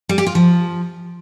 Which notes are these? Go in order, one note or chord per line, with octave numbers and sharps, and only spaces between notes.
G3
G4
F4
F3